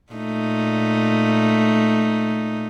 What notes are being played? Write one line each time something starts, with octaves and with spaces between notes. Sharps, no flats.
A#2 A3 D#4